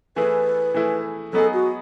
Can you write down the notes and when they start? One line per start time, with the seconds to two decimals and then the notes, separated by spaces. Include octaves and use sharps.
0.16 E3 A3 E4 G#4 B4
0.74 E3 A3 E4 G#4
1.33 F#3 B3 D#4 G#4 A4
1.54 F#4